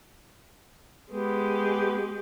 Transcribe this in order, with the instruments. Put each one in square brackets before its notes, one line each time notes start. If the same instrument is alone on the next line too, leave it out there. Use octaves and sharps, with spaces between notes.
[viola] G#3 G4 [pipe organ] B3